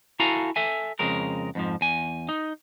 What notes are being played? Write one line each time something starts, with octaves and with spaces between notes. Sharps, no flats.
E4 F#4 A4 F5 G#5 A#5
A4 E5 G#5
F2 C#3 G#3 A#4
F2 G#2 F3
E2 G#5
D#4